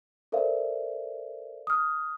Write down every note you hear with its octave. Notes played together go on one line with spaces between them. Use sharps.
A4 A#4 C5 D5 E5 F5
D#6 F6